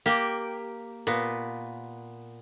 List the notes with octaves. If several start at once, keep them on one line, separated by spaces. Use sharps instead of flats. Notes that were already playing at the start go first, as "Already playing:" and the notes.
A#3 G4
A#2 B3